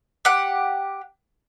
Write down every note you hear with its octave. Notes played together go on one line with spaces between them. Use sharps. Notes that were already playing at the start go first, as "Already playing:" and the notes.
G4 F#5